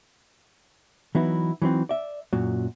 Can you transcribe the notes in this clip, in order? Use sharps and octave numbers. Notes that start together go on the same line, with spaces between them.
E3 F#3 B3 D#4 E4
E3 F#3 B3 C4 D#4
D5 E5
F#2 A#2 F#3